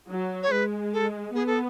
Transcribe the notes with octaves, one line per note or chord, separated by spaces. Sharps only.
F#3
C#5
G#3 B4
A4
B3 G#4
A4